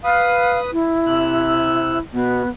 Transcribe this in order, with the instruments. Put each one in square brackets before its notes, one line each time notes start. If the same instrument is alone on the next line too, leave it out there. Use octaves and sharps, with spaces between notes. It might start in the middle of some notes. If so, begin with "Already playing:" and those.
[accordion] B4 D#6 [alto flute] F5
[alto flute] E4
[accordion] C3 E6 F#6
[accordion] B2 [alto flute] B3